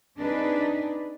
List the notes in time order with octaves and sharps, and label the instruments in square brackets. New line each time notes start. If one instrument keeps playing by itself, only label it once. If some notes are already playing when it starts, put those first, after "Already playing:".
[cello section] C4 D4 D#4 G#4 B4